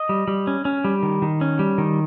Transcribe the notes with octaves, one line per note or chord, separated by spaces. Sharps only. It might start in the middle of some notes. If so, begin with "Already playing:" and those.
Already playing: D#5
G3
G3
C#4
C#4
G3
D#3
D#3
C#4
G3
D#3